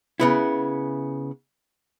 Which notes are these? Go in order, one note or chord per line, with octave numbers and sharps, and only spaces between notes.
C#3 B3 E4